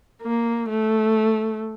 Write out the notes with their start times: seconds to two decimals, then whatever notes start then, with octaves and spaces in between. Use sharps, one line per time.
0.22 A#3
0.69 A3